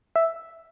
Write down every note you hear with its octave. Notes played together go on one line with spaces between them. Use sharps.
E5